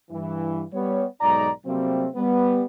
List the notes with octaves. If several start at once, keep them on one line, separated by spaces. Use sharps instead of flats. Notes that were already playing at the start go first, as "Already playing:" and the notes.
G2 E3
G3 B3 C#5
B1 G#2 D#4 D5 A#5
C3 F#3 G3 A3 A#3 C4
G3 B3